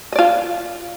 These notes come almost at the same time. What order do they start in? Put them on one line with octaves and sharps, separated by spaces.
D#5 D5 F4